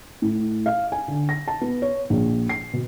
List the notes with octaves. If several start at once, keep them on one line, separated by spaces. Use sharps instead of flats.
A2
F5
G#5
D3
A#6
A5
B3
C#5
A#1
C7
B2